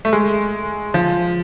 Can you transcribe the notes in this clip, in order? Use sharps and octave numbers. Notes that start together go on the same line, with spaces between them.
A3
G#3
F3